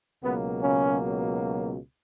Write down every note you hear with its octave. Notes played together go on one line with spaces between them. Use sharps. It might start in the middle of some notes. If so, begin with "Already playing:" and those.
C#2 B2 F#3 A#3 B3
C#3 C#4